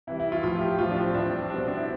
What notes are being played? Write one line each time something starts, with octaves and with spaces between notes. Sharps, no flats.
C3 E3 G3 E4
E4
F4
A2 F3 F4
G4
A2 F3 F4
D4
C4
A2 E3 G3 D4
C4
C4
B2 G3 D4
C4
D4
E4